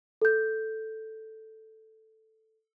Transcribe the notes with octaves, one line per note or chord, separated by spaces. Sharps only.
A4 G6